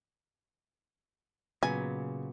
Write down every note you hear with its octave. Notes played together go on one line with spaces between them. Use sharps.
A#2 C#3 F#3 B3 G#5